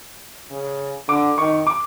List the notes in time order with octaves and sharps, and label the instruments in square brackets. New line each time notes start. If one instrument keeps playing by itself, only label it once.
[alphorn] C#3
[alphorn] D3 [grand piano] D6
[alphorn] D#3 [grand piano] C#6
[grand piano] D6